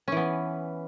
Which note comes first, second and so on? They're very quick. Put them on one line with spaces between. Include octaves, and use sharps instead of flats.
C#4 E3 B3